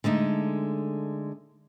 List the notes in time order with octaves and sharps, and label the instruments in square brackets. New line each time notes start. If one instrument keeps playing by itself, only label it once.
[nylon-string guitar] D3 G#3 A3 D#4